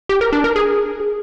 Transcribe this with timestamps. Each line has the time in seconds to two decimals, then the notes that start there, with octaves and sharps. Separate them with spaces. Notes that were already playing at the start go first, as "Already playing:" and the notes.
0.09 G4
0.21 A#4
0.33 D4
0.44 A#4
0.56 G#4